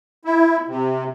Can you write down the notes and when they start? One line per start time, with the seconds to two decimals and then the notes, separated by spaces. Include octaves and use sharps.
0.25 E4
0.68 C3